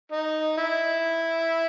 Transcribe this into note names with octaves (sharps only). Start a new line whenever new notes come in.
D#4
E4